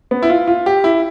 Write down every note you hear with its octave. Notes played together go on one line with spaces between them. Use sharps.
B3
E4
F4
F4
G4
E4